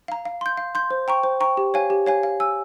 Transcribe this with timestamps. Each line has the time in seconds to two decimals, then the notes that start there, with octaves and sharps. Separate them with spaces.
0.08 F5 A#5
0.25 F5
0.41 C6 G6
0.57 F5
0.75 C6 G6
0.91 C5
1.08 G5 A#5 C#6
1.23 C5
1.40 G5 A#5 C#6
1.57 G4
1.74 C#5 F5 G#5
1.90 G4
2.06 C#5 F5 G#5
2.23 F5
2.40 G#5 E6